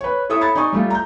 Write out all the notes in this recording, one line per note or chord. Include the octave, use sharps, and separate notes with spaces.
B4 C#5
E4 A4 C#5 E5 D#6
B5 G#6 A6 C#7
D#4 D5 G#5 C#6 D#6
G3 A3 F4
A#5 G6